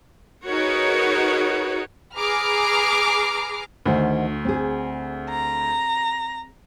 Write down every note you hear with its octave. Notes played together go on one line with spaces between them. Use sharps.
D#4 F#4 G#4 A#4 B4 C#5
G#4 B4 A#5 D6 F6 C7
D2 D3 D#3 C5
C4 G#4
A#5